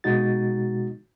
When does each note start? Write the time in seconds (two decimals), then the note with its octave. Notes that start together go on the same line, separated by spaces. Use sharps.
0.04 B2 G#3 D#4 F#4 A6